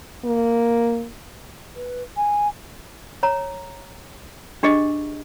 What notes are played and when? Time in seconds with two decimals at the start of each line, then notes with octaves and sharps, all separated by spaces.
0.24 A#3
1.76 B4
2.17 G#5
3.23 C#5 A#5
4.63 D4 G4 G#4 D#5